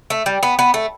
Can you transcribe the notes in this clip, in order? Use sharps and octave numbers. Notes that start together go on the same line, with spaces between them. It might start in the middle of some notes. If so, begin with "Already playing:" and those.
A3
G3
B3
B3
A3